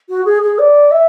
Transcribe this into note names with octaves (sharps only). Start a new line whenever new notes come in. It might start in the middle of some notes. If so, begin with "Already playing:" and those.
F#4
G#4
G#4
D5
E5